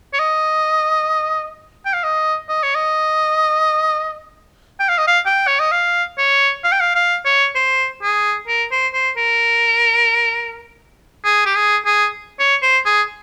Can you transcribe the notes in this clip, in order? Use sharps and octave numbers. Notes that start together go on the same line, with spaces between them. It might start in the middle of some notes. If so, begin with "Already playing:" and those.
C#5
D#5
G5
F5
D#5
D#5
C#5
D#5
G5
F5
D#5
F5
G5
C#5
D#5
F5
C#5
F5
G5
F5
F5
C#5
C5
G#4
A#4
C5
C5
A#4
G#4
G4
G#4
G#4
C#5
C5
G#4